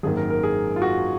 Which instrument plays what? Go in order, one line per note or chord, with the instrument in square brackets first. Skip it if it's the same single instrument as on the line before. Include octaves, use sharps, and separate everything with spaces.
[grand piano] G#1 F#2 D#3 A#3 G#4
A#4
A#4
G#4
F4
F#4